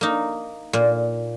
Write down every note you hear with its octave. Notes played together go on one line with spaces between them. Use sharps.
A#3 D#4
A#2